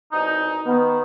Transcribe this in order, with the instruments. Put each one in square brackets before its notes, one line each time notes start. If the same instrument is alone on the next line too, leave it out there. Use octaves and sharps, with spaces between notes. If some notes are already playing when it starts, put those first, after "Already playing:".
[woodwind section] C2 B2 D#4
[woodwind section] D#3 [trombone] B3